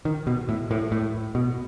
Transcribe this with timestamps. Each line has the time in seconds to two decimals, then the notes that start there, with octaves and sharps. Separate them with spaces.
0.05 D#3
0.27 B2
0.49 A2
0.71 A2
0.92 A2
1.35 B2